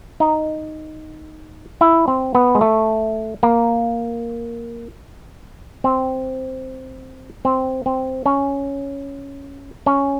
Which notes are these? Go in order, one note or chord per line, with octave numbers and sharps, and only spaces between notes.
D#4
E4
C4
B3
G#3
A3
A#3
C4
C4
C4
C#4
C#4